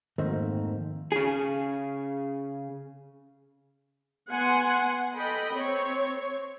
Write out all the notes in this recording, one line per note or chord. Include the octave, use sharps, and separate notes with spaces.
F2 G#2 D#3 A3 A#3 C4
C#3 G#4
B3 F#5 G#5 C6
A4 D#5 G5 B5
C4 C#5